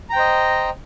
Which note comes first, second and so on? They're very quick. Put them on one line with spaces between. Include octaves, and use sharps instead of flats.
A#5 G5 C5 D#5